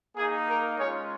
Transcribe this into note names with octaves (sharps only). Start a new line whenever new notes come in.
A#3 D#4 G#4
A#4
G#3 C#4 F4 G#4 C#5